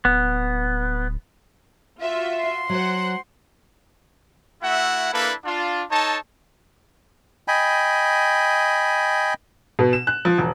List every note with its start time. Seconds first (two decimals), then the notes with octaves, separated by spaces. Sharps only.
0.05 D1 B3
2.01 F4 F#4 E5
2.39 C6
2.70 F#3 C5 F#5
4.62 A3 E4 F#4 E5 F#5
5.13 A#3 D4 E4 A4 B4
5.44 D4 F4
5.91 D#4 A4 C#5 A5
7.48 D#5 G5 G#5 B5
9.79 B2
9.93 E7
10.07 F#6
10.25 F3
10.38 E1